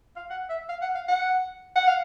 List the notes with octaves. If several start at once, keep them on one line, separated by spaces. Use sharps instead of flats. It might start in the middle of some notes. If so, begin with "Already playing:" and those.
F5
F#5
E5
F5
F#5
F5
F#5
F#5
F5